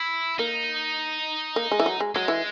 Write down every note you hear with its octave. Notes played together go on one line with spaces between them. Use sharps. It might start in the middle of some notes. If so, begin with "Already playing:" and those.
Already playing: E4
A#3 D#4
A#3
G#3
E3
F#3
G#3
F#3 G#3
E3